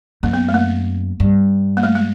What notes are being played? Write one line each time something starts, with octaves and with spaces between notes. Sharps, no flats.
F#2 A#3
B3
A3
A#3
G2
A#3
A3
G#3